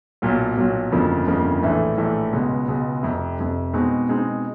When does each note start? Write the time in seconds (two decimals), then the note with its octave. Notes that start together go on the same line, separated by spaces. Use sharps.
0.22 B1 A#2 F#3
0.57 B1 A#2 F#3
0.92 G1 F2 C#3 F3 A#3
1.27 G1 F2 C#3 F3 A#3
1.63 A#1 A2 E3 A3
1.97 A#1 A2 E3 A3
2.33 C#2 B2 G#3
2.68 C#2 B2 G#3
3.03 F1 F2 C3
3.38 F1 F2 C3
3.73 B2 G#3 C4 D#4
4.09 B2 G#3 C4 D#4